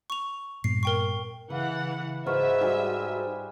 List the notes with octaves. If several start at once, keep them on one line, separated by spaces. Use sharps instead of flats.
C#6 F7
G2 A#2 B3 C7
A#4 G5 C#6
C#3 E3 B4 F5 F#5
G#2 F4 F#4 B4 E5
G3 D#4 F#4 G#4